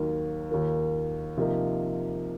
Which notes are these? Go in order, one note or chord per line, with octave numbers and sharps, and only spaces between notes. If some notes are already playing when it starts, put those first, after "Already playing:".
Already playing: D#2 D#3 F#3 A#3
D#2 D#3 A#3 F4 A#4
C3 F3 A#3 D#4